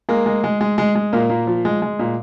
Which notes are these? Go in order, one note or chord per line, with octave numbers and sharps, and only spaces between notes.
G#3 A#3
G#3
G#3
G#3
G#3
G#3
A#2 A#3
A#2
F3
G#3
G#3
A#2